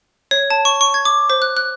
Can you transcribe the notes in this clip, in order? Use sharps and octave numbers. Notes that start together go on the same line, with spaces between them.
C#5
A5
C#6
C#6
G#6
D6
C5
F#6
F#6